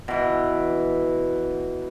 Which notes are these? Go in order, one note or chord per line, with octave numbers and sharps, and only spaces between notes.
B2 E3